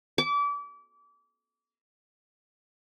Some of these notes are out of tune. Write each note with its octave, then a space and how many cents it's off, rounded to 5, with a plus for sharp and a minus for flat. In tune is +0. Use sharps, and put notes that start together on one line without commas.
D6 -30